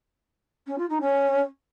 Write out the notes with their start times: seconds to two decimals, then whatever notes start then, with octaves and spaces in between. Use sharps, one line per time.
0.66 C#4
0.78 F4
0.89 D#4
1.00 C#4